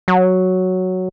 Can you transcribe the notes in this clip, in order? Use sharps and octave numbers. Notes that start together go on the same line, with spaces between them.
F#3